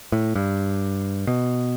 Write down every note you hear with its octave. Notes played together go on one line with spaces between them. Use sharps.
A2
G2
B2